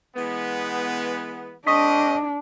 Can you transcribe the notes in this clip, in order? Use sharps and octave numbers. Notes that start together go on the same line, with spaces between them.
E3 G#3 B3
G#3 C4 D4 D#5 C#6 D#6 B6